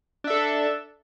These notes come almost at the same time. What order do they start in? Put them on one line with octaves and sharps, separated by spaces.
D4 E5 A4